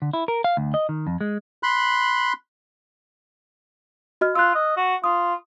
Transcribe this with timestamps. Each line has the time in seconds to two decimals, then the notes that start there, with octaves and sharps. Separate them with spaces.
0.02 D3
0.13 E4
0.28 A#4
0.44 F5
0.57 D2
0.74 D#5
0.89 D#3
1.07 F2
1.21 G#3
1.63 B5 C6 F#6
4.21 F#4 D#5 F6
4.35 F4 E6 F#6
4.55 D#5
4.77 F#4
5.04 F4 D#6